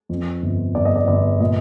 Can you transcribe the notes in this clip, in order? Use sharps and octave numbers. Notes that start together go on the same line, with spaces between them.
F2
G1
G1 D5
D#5
D5
G1 D5
A#2 D#5